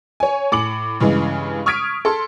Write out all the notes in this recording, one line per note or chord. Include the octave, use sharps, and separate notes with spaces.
C#5 G#5
A2 D6 C#7 F#7
G2 C#3 E3 G#3
C#6 D#6 F6 G#6 B6 D7
A4 C6